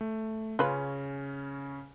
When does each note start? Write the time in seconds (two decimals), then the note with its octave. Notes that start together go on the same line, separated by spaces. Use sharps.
0.01 A3
0.59 C#3 C#4 F4 B4